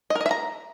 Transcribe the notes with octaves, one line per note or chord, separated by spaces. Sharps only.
D#5
A#4
D#5
E5
A#5